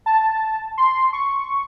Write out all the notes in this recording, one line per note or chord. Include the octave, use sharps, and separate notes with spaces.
A5
C6
C#6